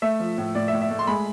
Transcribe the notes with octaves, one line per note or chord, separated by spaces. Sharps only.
A3 E5
F3
A2
A2 D5
E5
A2
E5
A3
C6
G#3 B5